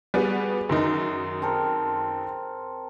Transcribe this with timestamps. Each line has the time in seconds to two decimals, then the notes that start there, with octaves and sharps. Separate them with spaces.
0.14 G3 B3 F#4 G#4
0.69 F#2 D#3 D#4
1.42 C4 A4 A#4